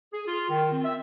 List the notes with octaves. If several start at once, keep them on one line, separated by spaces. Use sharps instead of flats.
G#4
F4
D#3
C4
E5